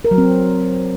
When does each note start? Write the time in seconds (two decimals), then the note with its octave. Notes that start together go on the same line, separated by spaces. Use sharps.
0.05 A#4
0.11 F#3
0.18 C4